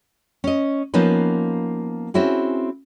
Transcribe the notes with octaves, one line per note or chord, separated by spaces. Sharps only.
C#4 D#5
F3 A#3 B3 C#4 D#4 B4
C4 C#4 E4 F#4 G#4